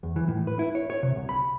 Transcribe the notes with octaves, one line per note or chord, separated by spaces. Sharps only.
E2
E3
A2
B4
E4
C#5
C#5
C3
C2
B5